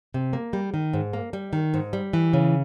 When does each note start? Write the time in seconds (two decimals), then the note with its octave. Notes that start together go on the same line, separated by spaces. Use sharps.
0.14 C3
0.33 A#3
0.53 G3
0.74 D#3
0.93 G#2
1.13 A#3
1.33 G3
1.53 D#3
1.74 G#2
1.93 G3
2.13 E3
2.33 C#3